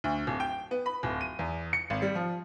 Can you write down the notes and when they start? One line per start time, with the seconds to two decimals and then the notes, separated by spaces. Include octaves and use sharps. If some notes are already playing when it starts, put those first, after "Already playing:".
0.04 D2
0.27 D1
0.40 G5
0.71 B3
0.86 B5
1.03 D1
1.21 D#7
1.39 E2
1.73 C#7
1.90 G#1
2.02 G3
2.15 F3